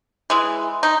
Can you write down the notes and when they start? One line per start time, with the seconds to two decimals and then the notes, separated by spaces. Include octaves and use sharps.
0.30 E3 G#3
0.83 D#4